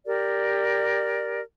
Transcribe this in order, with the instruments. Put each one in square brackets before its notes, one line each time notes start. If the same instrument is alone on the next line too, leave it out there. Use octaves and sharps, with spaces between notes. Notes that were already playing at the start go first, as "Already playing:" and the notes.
[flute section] G4 A#4 D5